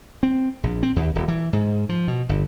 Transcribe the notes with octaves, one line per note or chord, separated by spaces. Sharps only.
C4
A#1
C4
D#2
D#1
E3
G#2
F3
B2
G1